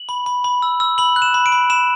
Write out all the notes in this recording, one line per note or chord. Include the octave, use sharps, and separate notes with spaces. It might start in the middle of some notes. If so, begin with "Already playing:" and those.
Already playing: F#7
B5
B5
B5
E6
E6
B5 F#7
F#6
E7
B5
D7
B5
B5 E7